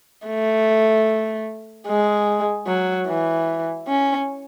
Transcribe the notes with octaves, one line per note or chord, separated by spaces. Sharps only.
A3
G#3
F#3
E3
C#4